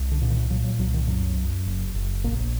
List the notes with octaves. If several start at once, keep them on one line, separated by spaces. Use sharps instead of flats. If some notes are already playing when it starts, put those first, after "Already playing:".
Already playing: C2
D3
A#2
D#3
A#2 F#3
F#3
C2 F#3
D#3
F#2 F#3
F#2
F#1
F#1
A#1 A#3